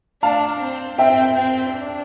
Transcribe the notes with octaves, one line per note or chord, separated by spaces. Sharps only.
D4 F5 A5
C4
C4 E5 G5
C4
D4